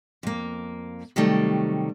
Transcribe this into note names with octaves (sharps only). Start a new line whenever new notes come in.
F2 A#3
C3 D#3 F#3 G3 A3